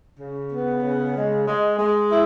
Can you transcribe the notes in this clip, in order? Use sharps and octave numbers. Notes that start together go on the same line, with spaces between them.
C#3
B3
C#3
G#3
G#3
G#3
E4